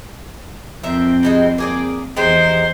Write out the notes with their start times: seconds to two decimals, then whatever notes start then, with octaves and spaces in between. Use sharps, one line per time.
0.83 F2 C4 A#4 E5
1.23 G3 G#3 D#4
1.58 A#3 G#4 D5
2.17 E2 G#3 D#4 G4 C5